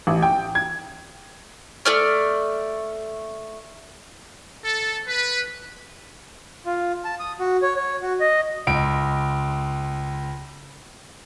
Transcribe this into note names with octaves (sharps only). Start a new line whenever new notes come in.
A1
G5
G#6
A3 D5 F6
A4
B4
F4
A5
D#6
F#4
C#5
C#5
F#4
D#5
C#2 D7